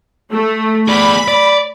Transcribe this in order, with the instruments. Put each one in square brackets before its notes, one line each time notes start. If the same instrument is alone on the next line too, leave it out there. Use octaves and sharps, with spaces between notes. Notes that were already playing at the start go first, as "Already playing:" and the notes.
[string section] A3
[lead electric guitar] G#4 D5 [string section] B5
[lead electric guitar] D5